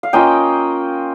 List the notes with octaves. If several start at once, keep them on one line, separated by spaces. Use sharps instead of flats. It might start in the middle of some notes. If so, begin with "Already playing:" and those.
F5
A#3 C#4 F4 D#5 G5